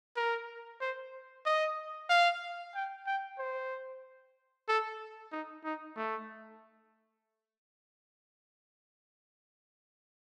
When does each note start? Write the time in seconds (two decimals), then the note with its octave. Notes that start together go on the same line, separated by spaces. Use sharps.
0.16 A#4
0.81 C5
1.46 D#5
2.10 F5
2.75 G5
3.07 G5
3.39 C5
4.68 A4
5.32 D#4
5.64 D#4
5.96 A3